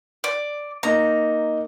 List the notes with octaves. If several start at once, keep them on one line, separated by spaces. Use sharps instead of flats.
D5
A#3 D#4 A#5